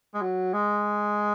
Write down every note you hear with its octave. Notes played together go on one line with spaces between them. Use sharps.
G#3
F#3
G#3